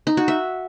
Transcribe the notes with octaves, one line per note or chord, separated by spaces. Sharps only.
D#4
F#4
E5